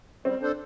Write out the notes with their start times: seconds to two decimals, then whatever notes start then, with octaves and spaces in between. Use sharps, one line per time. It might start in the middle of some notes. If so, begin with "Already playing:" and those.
0.25 G3 C4
0.42 D4 A4 C5